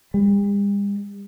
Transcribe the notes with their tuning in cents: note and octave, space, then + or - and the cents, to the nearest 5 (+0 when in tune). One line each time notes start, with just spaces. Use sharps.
G3 +45